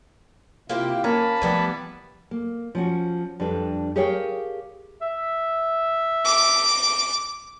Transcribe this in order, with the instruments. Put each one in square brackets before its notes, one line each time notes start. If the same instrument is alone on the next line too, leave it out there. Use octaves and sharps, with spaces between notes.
[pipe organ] C3 E4 F4 [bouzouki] A#3 G4 C5
[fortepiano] A#3 [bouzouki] C#4 [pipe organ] A5 B5
[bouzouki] E3 G3 B3 [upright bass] F3 A3
[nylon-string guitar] A#3
F3 C#4 F#4
F2 G3 D4 B4
G4 G#4 A#4 C#5 F5 G5
[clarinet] E5
[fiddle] D6